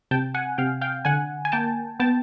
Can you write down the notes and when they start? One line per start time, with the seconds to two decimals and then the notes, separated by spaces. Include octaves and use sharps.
0.11 C3 G5 A5
0.34 F#5 G#5
0.58 C3 F5 G5
0.81 F5 G5
1.05 D3 F#5 G#5
1.45 G#5
1.52 A#3 G5 A5
2.00 B3 G5 A5